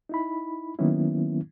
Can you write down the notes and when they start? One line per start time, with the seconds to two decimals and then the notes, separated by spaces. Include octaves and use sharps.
0.09 D#4 E4 B5
0.79 D#3 F#3 A#3 B3 C#4 E4